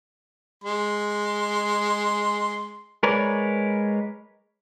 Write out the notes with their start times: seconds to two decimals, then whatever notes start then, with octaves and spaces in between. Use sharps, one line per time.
0.64 G#3 C6
3.03 G#3 A#4 B4 C#5 D5